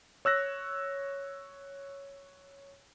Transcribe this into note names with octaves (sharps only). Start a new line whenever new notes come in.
C#5 E6 F#6 A#6